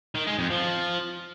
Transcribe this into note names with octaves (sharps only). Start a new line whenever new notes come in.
D#3
G#3
F2
F3